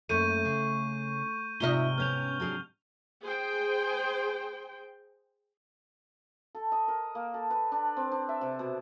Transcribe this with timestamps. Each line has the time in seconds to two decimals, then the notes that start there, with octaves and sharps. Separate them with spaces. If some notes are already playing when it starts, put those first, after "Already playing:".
0.09 F#2 A3 A#3 C#6 G6 D#7
0.45 C#3
1.60 G#2 C3 D#4 F4 D#5 E5 F6 G7
1.98 B3 C#4 F6 G6 F7
2.40 F#3 D4 G#4
3.22 G#4 C5 G5
6.55 A4
6.72 D#5
6.88 A#4
7.15 A#3
7.34 A4
7.51 B4
7.72 D4
7.97 C4
8.12 D4
8.29 E5
8.41 C3
8.59 B2